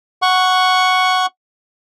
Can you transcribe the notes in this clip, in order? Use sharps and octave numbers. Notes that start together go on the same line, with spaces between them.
F#5 C#6